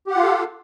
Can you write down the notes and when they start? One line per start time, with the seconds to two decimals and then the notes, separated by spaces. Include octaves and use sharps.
0.07 G4
0.11 F#5
0.15 F4
0.19 F5
0.23 A4